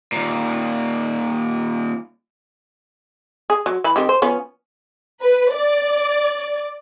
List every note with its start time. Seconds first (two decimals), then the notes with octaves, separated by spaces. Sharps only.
0.12 D#2 A#2
3.50 G#4
3.66 F#3
3.84 E3 B5
3.96 D#3 C4 G4
4.09 C5
4.22 F3 B3 C#4
5.22 B4
5.53 D5